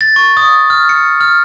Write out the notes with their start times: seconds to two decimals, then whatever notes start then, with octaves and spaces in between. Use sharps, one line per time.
0.01 A6
0.16 C#6
0.37 D#6
0.70 F6
0.89 C#7
1.21 F6